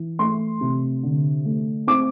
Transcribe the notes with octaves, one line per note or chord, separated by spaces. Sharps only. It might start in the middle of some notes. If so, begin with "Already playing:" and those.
Already playing: E3
A3 C6
C3
D3
A3
C4 D6